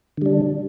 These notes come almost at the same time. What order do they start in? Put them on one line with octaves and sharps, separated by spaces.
D3 G3 D4